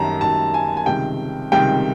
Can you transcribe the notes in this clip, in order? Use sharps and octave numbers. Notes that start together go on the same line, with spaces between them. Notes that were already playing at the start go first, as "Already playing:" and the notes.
Already playing: F#2 D#3 G3 A5 A#5
F#2 D#3 G3 A5
G#5
G#5
C#2 C3 D#3 G3 G5
C#2 C3 D#3 G3 G5